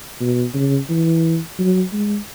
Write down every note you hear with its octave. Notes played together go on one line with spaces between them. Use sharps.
B2
C#3
E3
F#3
G#3